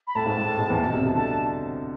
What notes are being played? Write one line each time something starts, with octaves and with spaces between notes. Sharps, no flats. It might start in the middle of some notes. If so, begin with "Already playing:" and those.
B5
A2 A3 A5
G#2 G#3
G#2 G#3
A2 A3
G#2 G#3
E2 E3
B2 A5
C2 C3
C2 C3
D3 A5